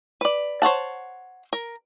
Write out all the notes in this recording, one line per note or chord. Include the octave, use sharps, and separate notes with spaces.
B4 D5
C5 C#5 F#5 A5
A#4